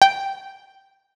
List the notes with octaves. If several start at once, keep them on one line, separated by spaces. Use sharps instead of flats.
G5